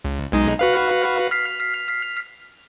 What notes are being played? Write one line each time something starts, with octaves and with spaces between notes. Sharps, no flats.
C#2
B1 G#3 D#4
F#4 B4 F5
F6 B6 C7